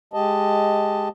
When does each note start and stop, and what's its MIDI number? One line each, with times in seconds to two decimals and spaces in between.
0.13 1.09 56
0.13 1.09 67
0.13 1.09 75
0.13 1.09 81